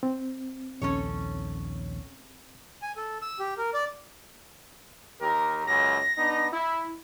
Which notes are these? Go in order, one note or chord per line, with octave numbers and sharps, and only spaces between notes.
C4
A#1 D#2 C#4 A4 C#5
G#5
A4
E6
G4
A#4
D5
D#2 G4 A#4
C#2 F#2 A#6
B3 D4 D#4
E4